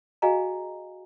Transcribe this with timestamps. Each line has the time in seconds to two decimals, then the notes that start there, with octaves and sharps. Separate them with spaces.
0.22 F#4 G#4 D#5 F5 G#5 A#5